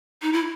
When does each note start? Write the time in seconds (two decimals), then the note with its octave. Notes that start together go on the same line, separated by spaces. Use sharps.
0.22 D#4
0.33 E4